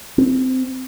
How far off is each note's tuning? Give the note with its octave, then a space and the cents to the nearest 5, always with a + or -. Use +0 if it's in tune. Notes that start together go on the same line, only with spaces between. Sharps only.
C4 -15